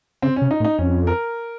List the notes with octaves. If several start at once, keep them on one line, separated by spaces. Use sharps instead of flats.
C#3 C4
C#4
C3
D#4
A2
D#4
F2 C#4
A#4